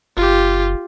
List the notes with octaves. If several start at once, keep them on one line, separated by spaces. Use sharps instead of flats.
F#1 F4 G4